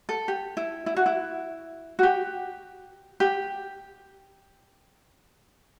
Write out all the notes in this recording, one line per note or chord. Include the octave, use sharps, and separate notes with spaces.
A4
G4
E4
E4
F#4
E4
F#4
G4
G4